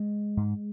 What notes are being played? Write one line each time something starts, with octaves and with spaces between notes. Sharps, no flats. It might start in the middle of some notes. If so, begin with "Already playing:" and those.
Already playing: G#3
G#2